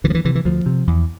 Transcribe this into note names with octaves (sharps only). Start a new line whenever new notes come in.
D2 E3
F3
E3
C3 E3
E3
D2 F3
C3
E2